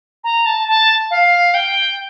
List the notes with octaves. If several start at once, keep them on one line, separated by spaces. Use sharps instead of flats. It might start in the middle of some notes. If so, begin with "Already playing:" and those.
A#5
A5
A5
F5
G5